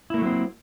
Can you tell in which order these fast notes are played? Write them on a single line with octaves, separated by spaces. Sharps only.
E4 A#3 A3 F#3 C4